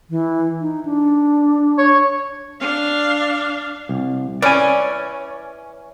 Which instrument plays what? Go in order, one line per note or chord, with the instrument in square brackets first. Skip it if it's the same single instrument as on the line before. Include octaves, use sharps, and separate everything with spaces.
[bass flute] E3
D#4
D4
[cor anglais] C#5
[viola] D4 F5
[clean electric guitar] C2
[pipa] E3 C#4 [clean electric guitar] D5 G#5